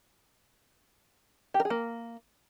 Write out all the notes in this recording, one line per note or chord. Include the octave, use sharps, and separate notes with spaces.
G4
A#4
G#4
A#3